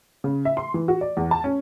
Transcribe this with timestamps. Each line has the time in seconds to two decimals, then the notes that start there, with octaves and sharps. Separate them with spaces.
0.24 C#3
0.45 E5
0.57 C6
0.74 E3
0.88 F#4
1.01 D5
1.17 E2
1.31 A5
1.44 C#4